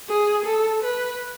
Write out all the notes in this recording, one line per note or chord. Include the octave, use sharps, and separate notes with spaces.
G#4
A4
B4